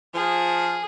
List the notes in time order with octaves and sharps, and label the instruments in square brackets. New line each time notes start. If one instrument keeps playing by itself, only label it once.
[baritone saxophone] F3 [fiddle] G#4